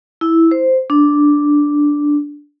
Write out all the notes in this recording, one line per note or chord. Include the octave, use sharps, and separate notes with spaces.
E4
C5
D4